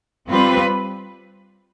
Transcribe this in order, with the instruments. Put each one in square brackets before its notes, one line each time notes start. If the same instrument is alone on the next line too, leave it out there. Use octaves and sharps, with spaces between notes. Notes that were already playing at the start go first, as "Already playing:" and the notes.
[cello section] G3 C4 F4 B4